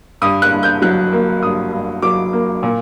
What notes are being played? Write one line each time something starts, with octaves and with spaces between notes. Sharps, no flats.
G2 D#6
F#6
G2
G6
F#3 F#6
A#3
G2 D#6
G2
F#3 D6
A#3
A#2